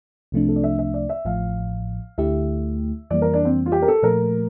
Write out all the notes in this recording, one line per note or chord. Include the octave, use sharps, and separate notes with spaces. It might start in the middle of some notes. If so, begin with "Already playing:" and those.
C2 C3 F3 A3 D4
A4
D5
E5
E5
D5
E5
A1 A2 F3 F5
D2 D3 A3 E4 G4 E5
F2 E3 G3 A#3 D5
A#4
D4
C4
F4
G4
A#4
A4
A#2 F3 A3 A#4